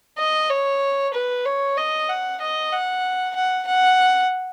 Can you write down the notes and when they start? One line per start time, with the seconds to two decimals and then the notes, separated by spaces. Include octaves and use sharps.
0.18 D#5
0.50 C#5
1.13 B4
1.45 C#5
1.77 D#5
2.09 F#5
2.41 D#5
2.72 F#5
3.35 F#5
3.67 F#5